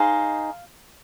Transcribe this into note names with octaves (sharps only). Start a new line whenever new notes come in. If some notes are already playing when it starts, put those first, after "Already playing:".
Already playing: D#4 G#4 C5 F5